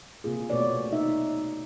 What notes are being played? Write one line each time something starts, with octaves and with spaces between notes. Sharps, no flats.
C3 A#3 F4 G#4
B2 A3 F#4 B4 C#5 D5
D#4 E5